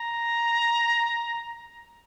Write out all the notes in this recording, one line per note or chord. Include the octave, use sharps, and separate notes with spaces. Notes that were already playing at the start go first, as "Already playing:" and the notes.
Already playing: A#5